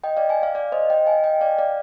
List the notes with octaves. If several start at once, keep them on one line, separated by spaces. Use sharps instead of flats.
D#5 G5
D5 F5
F5 G#5
D5 F5
D5 F5
C5 D#5
D#5 G5
F5 G#5
D#5 G5
D5 F5
D5 F5